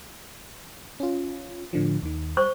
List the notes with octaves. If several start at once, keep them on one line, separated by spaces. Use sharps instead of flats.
C#4 F4
A2 D3 F3
D#2 D#3
G3 C5 C#6